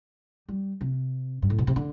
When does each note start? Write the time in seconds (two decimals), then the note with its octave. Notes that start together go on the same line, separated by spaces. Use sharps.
0.49 G3
0.81 C3
1.42 G2
1.50 A2
1.58 B2
1.67 C3
1.76 D3